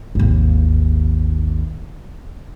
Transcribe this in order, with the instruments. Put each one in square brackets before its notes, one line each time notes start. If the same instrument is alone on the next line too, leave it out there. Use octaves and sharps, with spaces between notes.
[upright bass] G#1 D#2